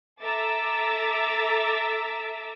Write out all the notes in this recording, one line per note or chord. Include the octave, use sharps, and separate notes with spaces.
A4 E5 A#5 D6 E6 A6